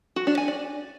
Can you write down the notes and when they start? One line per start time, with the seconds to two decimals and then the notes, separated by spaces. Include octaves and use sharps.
0.16 F#4
0.27 D4
0.37 G#5
0.48 D5